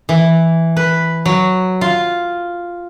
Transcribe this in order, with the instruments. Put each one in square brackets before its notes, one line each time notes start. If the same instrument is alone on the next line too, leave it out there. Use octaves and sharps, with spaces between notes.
[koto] E3
B4
F#3
F4